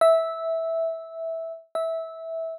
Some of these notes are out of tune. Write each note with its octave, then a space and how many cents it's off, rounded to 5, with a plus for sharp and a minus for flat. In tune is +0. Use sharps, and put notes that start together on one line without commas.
E5 -10
E5 -15